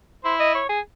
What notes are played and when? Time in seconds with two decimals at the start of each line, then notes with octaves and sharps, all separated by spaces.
0.24 E4 C5
0.40 D#5
0.55 C#5
0.69 G#4